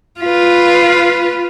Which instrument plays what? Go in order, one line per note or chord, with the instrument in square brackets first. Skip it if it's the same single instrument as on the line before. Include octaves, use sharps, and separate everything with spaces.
[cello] F4 B4